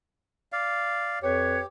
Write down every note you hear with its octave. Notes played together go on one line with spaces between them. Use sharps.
D5 F5
F2 G4 B4 C#5